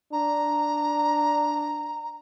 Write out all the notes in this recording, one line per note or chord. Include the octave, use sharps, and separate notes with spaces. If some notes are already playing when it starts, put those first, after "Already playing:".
D4 A#5